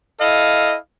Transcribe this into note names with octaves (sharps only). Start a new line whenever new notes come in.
E4 A4 D#5 F5